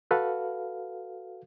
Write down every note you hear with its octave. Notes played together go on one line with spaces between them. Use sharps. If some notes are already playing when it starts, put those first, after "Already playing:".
F#4 A4 B4 F5